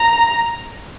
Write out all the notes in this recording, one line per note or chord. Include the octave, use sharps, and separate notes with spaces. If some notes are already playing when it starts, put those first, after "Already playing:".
Already playing: A#5